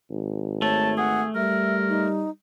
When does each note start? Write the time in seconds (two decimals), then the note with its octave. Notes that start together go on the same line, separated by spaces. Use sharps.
0.10 G#1
0.62 A3 C#5 A5
0.98 G#4 F#5
1.36 G3 A#4 E5
1.89 D#4